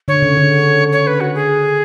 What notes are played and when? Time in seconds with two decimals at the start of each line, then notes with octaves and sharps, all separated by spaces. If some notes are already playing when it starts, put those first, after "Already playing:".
0.08 D3 C#5
0.22 C#3
0.37 D3
0.92 C#5
1.07 B4
1.21 F#4
1.35 G#4